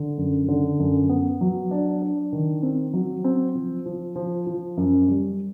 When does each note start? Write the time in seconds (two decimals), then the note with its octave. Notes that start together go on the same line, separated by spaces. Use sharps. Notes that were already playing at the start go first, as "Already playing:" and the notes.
Already playing: D3
0.18 F#2
0.48 D3
0.79 F#2
1.09 B3
1.41 F#3
1.71 D4
2.02 D4
2.32 D#3
2.62 C4
2.94 F#3
3.24 C4
3.55 F3
3.86 F3
4.16 F3
4.47 F3
4.77 F#2
5.08 G3